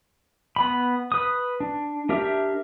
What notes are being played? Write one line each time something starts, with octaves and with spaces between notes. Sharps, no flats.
B3 B5
B4 D#6
D4
D4 G4 A#4 E5